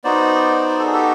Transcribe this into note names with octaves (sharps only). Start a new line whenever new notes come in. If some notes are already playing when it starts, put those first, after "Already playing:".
B3 D#4 F#4 C5 D5
A4
G#4
G4 A4